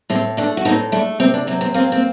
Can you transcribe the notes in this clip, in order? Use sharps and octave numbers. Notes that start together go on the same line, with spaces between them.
A2 C4
A3 D4
F#4
A2 C4 D#4
A3 D4
C3 C4
D4
F#3 C4
C4
A#3 C4
C4